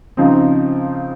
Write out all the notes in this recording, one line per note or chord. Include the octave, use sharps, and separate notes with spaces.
C#3 F3 C4 D#4